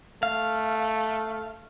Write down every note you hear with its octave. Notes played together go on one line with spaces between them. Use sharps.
A3 F5